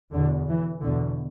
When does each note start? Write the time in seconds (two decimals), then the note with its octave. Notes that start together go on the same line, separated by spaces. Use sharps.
0.13 E2 B2 D3
0.48 E3
0.83 E2 B2 D3